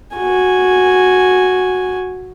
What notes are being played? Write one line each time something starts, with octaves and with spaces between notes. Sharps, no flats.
F#4 G#5